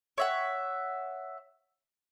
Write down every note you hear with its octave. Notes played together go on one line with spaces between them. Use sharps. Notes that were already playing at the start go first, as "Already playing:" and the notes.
C#5 E5 F#5